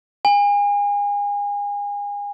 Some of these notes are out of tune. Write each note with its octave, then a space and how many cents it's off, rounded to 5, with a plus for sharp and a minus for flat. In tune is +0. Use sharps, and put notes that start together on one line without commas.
G#5 -30